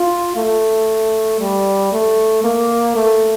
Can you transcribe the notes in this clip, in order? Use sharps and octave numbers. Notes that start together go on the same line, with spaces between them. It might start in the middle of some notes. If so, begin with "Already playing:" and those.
Already playing: F4
A3
G3
A3
A#3
A3